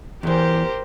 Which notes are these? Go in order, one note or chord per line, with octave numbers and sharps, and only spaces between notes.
E2 E3 G4 A#4 C5